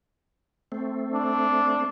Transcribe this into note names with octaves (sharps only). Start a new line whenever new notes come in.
A3 C4
D4